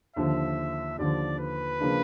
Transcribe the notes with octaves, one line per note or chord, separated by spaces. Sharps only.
D#2 D3 F3 E5
D#2 D3 F3 D5
B4
C#3 F3 A#3 D4